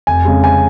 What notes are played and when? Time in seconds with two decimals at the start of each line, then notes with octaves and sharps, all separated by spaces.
0.07 F1 G#5
0.25 F2 C#3 G#3
0.44 F1 G#5